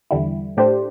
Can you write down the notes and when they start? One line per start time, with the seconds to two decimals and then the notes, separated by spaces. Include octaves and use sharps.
0.11 E2 D3 G3 E4
0.57 A2 A3 D4 G4 C5